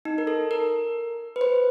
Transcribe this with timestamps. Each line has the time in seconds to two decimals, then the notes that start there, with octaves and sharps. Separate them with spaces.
0.05 D#4
0.18 A#4
0.27 A4
0.51 A#4
1.36 B4
1.41 C5